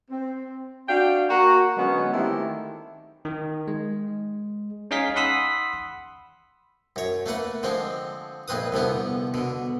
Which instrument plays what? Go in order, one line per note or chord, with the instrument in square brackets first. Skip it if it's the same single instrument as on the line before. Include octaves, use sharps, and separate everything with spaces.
[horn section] C4
D4 F#4 F5 G5
A#3 F#4 A#5
D3 F#3 G#3 B3 C#4 C#5
D#3 A3 C4 E4 G4
[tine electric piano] D#3
G#3
C#4 D#4 G#4 F5 B6
F#5 B5 C6 D#6 E6 B6
[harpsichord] F#2 C#5
A3 A#3 B4 F#5
D3 F3 G#3 C4
A#1 F2 C4 B4 D#6
C2 D3 F3 B3
B2 D3